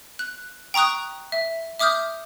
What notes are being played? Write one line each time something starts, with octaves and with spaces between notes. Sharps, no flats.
F#6
G5 A#5 C#6 D#6 F#6
E5
E5 D6 D#6 F6 G6